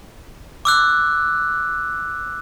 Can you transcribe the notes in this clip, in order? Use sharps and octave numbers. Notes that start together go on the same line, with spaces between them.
D6 E6 F#6